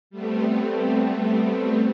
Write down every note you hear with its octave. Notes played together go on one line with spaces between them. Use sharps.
G3 A3 B3 C4